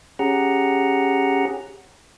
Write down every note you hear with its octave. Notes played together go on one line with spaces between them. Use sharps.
C#4 G4 G#4 F#5 A#5